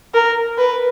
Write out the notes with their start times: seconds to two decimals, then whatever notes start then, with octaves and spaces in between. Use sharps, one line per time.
0.14 A#4
0.58 B4